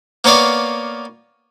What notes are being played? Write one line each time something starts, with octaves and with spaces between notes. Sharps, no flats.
A#3 B3 C#5 D5 F5